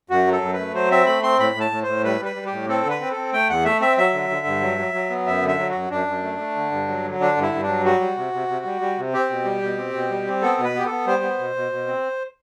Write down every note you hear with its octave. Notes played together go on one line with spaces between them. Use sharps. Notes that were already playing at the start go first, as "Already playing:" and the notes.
F#2 F#4
F#3
A4
F#2
B4
A3
F#3 C5
C4 E5
A3 B5
C4 C6
A2 B5
A2
A5
A2
A2 C5
G3 B4
G3 B4
G3
G4
A2
C4 A4
D3 B4
C4
A4
C4
A3 G5
E2 F#5
A3 E5
C4 E5
F#3 E5
D3
D3
G2
F#3
F#3
F#3
B3
F#2 E5
D3
E5
F#3
F#2 F#4
F#2 D4
F#2
A3
A3
D3
G2
F#3
D3
D3 D4
G2
E4
G2
D4
F#3
G3 F#4
G3
C3
C3
C3
G3
G3
C3
C4 G4
B2
G3
B2
C4
B2
G3
C4
B3 A4
B2
B4
B3 G4
A4
B3
G3 C5
B3
B2
B2
B2
C4